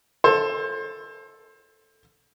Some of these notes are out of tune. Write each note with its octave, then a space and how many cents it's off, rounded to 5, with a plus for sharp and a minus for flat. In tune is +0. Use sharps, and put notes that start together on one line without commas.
A4 +0 C5 +30